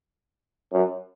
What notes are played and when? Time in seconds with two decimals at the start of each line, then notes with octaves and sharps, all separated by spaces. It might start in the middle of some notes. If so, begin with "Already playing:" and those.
0.73 F#2